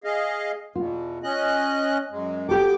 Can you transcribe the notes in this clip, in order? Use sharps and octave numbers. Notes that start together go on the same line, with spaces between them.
G#4 D#5 F5
E2 B2 F4
C#4 D#5 F#6
F#2 G#3
B3 G4 A4 G5 D6